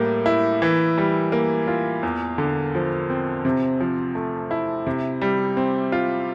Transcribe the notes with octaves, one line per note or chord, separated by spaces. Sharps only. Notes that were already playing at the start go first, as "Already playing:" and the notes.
Already playing: A2 G3 A#3
E4
E3
G3
A#3
F4
E2
D3
F3
C4
C3
F3
A3
E4
C3
G3
C4
F4